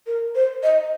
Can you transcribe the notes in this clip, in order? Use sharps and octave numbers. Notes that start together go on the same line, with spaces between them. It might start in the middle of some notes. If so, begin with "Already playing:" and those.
A#4
C5
D#5